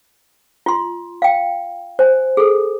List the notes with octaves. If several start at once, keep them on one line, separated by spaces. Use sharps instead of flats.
F4 C6
F5 G5
C5 G#5
G#4 A4